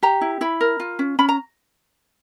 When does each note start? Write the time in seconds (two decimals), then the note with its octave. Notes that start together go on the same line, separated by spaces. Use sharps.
0.03 G4 A#5
0.21 E4
0.41 E4 B5
0.61 A#4
0.80 F4
0.99 C#4
1.19 C#4 B5
1.29 A#5